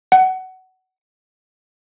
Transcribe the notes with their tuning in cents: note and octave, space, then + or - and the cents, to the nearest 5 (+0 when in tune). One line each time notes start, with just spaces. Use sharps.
F#5 +20